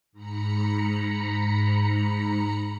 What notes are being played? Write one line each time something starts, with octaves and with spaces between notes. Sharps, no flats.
G#2 A#5 B5 C#7